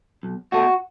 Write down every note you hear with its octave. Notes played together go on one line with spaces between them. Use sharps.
B1
B2 A3 F#4